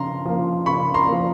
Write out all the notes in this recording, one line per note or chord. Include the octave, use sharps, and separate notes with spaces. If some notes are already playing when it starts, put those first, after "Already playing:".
Already playing: C#3 F3 A#5 C6
F3 A#3
C#3 B5 C#6
A#5 C6
A#3
F3